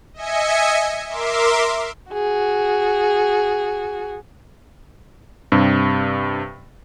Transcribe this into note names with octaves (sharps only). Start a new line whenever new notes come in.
D#5 E5 G#5 C#7
A#4 E5 C6 D6
F#4 G#4
G2 C3